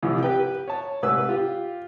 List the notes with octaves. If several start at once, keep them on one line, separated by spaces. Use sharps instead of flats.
C2 E3 F3
G4 B4 G5
C#5 A5
C2 G#2 B4 E6
F4 G4